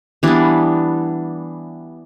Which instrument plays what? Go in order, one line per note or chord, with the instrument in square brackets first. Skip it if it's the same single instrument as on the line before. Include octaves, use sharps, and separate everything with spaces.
[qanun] E3 G3 B3 D4